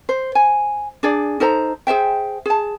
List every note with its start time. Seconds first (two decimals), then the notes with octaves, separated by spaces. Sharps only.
0.09 C5
0.35 G#5
1.03 D4 G#4 D5
1.40 D#4 A4 C5 A#5
1.87 G#4 C5 E5 G5
2.46 G#4 A5